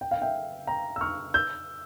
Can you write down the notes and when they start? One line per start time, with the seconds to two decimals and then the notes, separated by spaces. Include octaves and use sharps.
0.01 G5
0.11 F5
0.22 E5 G5
0.67 G5 A#5
0.96 E6
1.01 C#6 F6
1.34 E6 G6